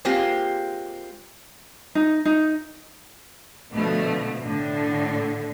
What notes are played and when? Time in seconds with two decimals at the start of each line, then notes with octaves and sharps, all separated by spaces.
0.05 G#3 A#3 C4 F4 G4
1.95 D#4
2.25 D#4
3.71 B2 D3 F3 A3
4.42 A2 D3